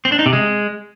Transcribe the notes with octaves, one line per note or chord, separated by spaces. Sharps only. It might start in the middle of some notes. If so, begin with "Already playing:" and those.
C4
D4
D#4
C3
G#3